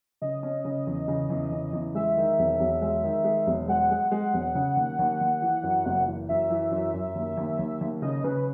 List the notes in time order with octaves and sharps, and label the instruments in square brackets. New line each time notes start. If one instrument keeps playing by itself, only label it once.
[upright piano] C#3 [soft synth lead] D#5
[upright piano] C#4
C#3
E2
C#3
E2
C#3
E2
[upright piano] G#3 [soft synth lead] E5
[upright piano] D#3
E1
E1
G#3
D#3
G#3
E1
[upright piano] G#3 [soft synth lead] F#5
[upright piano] G#3
G#3
E1
C#3
D#2
D#2
D#2
E3
F#2
F#1
E3
[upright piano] F#2 [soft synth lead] E5
[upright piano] E3
F#2
F#2
D#2
D#2
D#2
D#2
[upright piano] C#3 [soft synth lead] D#5
[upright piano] C#3 [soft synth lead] B4